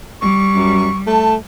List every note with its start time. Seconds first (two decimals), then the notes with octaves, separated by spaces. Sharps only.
0.21 G3 C#6
0.53 F#2
1.07 A3 A5